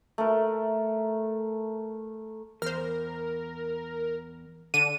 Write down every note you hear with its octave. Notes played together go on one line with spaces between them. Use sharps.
A3 A#4
E2 A#4 C5 F6
D3 D#7